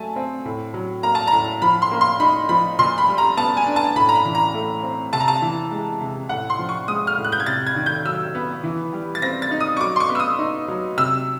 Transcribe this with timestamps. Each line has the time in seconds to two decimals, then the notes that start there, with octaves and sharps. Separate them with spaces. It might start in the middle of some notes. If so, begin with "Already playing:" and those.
Already playing: F#3 A3 G#5 A5
0.16 C4
0.45 A2
0.74 F#3
1.03 A#3 A#5
1.15 A5
1.27 A2 A#5
1.62 F3 B5
1.82 C6
1.91 A#3
2.01 C6
2.20 D#4 B5
2.49 F3 B5
2.79 A#2 C6
2.98 B5
3.08 G3
3.18 A#5
3.37 B3 A5
3.57 G#5
3.66 D4
3.76 A5
3.96 A2 B5
4.09 A#5
4.15 B5
4.25 E3
4.35 A#5
4.54 A3
4.83 C4
5.13 C3 A5
5.20 A#5
5.28 A5
5.42 E3
5.71 G#3
6.00 C3
6.29 A2 F#5
6.50 C6
6.59 F3
6.69 C#6
6.88 G#3 D#6
7.07 F6
7.17 A2
7.24 F#6
7.32 G6
7.40 G#6
7.46 C3 A6
7.67 G#6
7.76 D#3
7.86 G6
8.05 F#3 E6
8.35 B3
8.64 E3
8.93 G3
9.15 A6
9.22 C4 A#6
9.42 A6
9.51 D#4
9.60 D#6
9.77 C#6
9.80 F#3 D6
9.96 C6
10.00 C#6
10.10 B3
10.15 E6
10.20 D#6
10.39 D#4
10.68 F#3
10.97 C3 E6